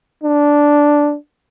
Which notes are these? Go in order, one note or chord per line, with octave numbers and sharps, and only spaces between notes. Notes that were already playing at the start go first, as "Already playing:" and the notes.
D4